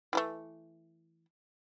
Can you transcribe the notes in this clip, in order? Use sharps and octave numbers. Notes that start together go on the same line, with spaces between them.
E3 F3 A3